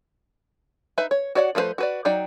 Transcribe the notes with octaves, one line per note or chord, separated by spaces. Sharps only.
D#4 B4 E5
C#5
F#4 C#5 D5 E5 F#5
F3 A3 F#4 B4 C5
F#4 B4 D5
F#3 D#4 D5 G5